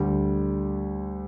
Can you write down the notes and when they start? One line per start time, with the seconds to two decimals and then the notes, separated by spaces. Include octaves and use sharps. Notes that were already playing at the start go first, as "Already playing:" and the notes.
Already playing: D2 D3 G3